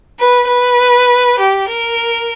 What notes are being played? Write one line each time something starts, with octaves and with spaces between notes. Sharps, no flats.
B4
B4
G4
A#4